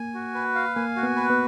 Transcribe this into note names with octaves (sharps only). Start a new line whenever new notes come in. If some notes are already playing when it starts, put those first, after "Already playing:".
Already playing: A#3 G#5
F#4
B4
F5
A#3 G#5
F#4
B3
B4
B3